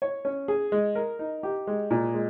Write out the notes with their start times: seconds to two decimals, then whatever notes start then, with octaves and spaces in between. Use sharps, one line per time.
0.02 C#5
0.25 C#4
0.48 G#4
0.72 G#3
0.95 A#4
1.19 D#4
1.43 G4
1.67 G#3
1.91 A#2
2.14 G#3